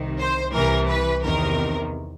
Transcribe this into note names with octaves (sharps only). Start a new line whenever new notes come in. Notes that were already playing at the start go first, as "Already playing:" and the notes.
Already playing: C2 C3 D#3
C5
C2 C3 E3 A#4
B4
E2 C3 D#3 A#4